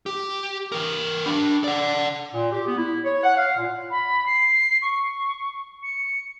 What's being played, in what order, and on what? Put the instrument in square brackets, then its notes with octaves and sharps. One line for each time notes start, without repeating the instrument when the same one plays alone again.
[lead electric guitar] G4
E3 A#4
D4 B5
D5 F#5
[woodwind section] A#2
G4
B3
E4
C#5
F#5
F5
A#2
[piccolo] B5
C7
C#6
C#7